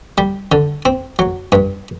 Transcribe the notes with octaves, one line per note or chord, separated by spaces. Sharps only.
G3
D3
C4
F#3
G2